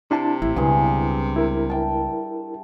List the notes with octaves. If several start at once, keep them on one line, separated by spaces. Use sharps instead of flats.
C3 D4 E4 A5 C6 D6
A1 E4
C#2 G2 B2 G#4
E4 A#4
E5 G5 A5